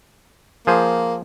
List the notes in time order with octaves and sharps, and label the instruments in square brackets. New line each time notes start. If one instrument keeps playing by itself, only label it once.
[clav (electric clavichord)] F3 G#4 C5 [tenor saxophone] A#3